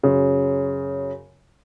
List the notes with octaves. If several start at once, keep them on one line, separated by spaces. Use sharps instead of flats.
F#2 C#3